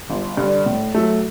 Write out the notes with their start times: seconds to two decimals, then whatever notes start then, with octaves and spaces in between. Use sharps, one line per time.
0.10 G1
0.37 G2 D3
0.66 A2
0.94 F#3 A3